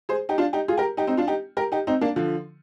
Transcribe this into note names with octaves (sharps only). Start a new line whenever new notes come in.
G#4 C5
D#4 G4
D4 F4
D#4 G4
F4 G#4
G4 A#4
D#4 G4
C4 D#4
D4 F4
D#4 G4
G4 A#4
D#4 G4
C4 D#4
A#3 D4
D3 F3